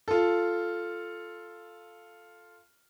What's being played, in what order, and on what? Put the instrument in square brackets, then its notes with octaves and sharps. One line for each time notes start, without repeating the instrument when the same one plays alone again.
[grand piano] F4 A4